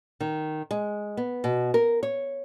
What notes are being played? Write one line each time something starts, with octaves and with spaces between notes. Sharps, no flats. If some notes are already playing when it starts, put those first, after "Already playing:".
D#3
G#3
B3
B2
A#4
C#5